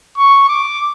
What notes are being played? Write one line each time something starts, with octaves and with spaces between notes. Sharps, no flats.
C#6
D6